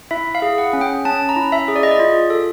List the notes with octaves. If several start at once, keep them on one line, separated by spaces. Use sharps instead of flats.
E4 E5
F5
G#4
F#5
C#4
G5
C#4 A5
A#5
E4
E5
G#4
D5
D#5
D5
F4
A4